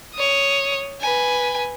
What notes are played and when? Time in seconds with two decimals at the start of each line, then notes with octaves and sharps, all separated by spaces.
0.14 C#5 D#6
1.01 B4 G#5